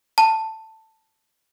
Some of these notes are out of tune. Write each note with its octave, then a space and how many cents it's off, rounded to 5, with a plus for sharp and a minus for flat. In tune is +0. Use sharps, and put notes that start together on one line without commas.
A5 +10